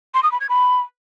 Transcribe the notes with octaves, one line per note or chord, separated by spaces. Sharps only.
C6
D#6
B5
G#6
B5